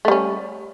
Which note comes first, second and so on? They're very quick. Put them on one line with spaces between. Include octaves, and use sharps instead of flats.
A3 G3 C#4